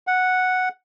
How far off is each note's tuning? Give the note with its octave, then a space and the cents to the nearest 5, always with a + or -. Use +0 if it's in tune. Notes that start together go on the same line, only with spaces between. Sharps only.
F#5 -5